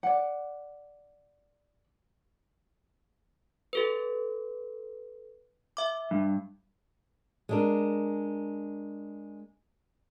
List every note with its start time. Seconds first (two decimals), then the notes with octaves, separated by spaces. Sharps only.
0.03 D5 F#5
3.73 G4 A4 B4
5.77 E5 D6
6.11 G2
7.49 G#3 D4 A#4